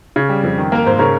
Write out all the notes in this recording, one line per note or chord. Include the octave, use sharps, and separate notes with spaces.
C#3
G3
F2
D#3
A#3 A#4
G#2 C5
C#3 A#4 C#5